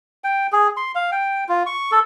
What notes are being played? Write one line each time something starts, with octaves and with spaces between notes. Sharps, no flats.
G5
G#4
C6
F5
G5
F4
C#6
A4